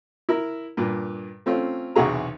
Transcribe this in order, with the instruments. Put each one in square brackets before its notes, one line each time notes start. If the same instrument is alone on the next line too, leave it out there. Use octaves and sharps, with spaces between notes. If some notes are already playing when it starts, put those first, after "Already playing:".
[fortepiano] E4 A#4
G2 A#2
A3 C4 C#4 F4
B1 E2 C3 F#4 G#4 A#5